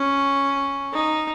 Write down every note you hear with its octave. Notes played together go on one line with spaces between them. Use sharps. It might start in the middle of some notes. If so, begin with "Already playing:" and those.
Already playing: C#4
D#4